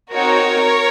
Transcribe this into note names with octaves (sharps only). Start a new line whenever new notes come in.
C4 D#4 F#4 A#4 C#5